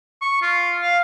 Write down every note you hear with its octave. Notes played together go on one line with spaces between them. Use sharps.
C#6
F4
F5